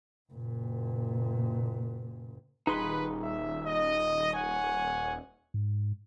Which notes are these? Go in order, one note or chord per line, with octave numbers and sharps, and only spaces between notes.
F#1 A#2
D#1 D#4 G#4 B4 C6
E5
D#5
C#5 F#5 G#5
G#2